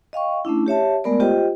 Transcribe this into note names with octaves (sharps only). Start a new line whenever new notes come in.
D#5 F5 G5 C#6
A3 C#4 D4 E4
G4 C#5 E5 A5
G#3 A3 B3 A#4 D5
F4 G4 C5 D#5 G5